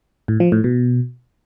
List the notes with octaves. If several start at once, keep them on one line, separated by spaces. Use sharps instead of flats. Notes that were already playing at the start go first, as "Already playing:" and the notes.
A2
F3
A2
B2